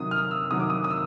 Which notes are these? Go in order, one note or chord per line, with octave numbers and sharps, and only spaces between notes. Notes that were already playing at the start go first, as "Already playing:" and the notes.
Already playing: C3 D#3 F#3 D#6
F6
E6
C3 D#3 F#3 D#6
D6
D#6
D#6
E6